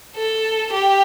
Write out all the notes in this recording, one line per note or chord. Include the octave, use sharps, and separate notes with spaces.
A4
G4